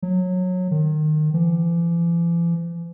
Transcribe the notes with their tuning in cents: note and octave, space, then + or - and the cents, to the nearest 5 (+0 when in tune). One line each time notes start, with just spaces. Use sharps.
F#3 -20
D#3 -25
E3 +45